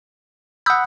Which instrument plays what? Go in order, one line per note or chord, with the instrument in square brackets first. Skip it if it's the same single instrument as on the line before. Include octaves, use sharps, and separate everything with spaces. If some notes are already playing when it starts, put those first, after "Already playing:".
[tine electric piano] F#5 B5 [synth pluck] D#6 E6 G6